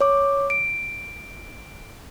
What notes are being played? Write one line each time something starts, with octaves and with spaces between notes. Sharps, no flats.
C#5 D6
D7